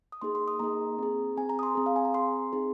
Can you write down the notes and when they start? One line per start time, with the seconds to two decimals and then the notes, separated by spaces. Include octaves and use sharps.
0.12 D#6
0.21 A#3 D#4 G#4 C6
0.35 C6
0.48 D#6
0.59 A#3 D#4 G#4 A#5
0.99 C4 G#4
1.37 C4 G#4 G#5
1.49 A#5
1.59 D#6
1.63 C6
1.75 C4 G#4
1.86 F5
1.96 G#5
2.05 A#5
2.14 C4 G#4 C6
2.53 C4 D#4 G#4